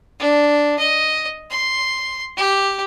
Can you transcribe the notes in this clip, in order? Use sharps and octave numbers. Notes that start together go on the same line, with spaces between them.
D4
D#5
C6
G4